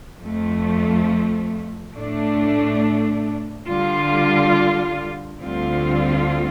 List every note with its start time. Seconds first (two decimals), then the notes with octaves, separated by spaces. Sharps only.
0.22 F2 F3 A3
1.95 A2 A3 D4
3.67 D3 G3 F4
5.40 D2 D3 G3 C4 F4